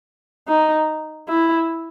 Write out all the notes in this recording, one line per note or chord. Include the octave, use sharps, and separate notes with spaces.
D#4
E4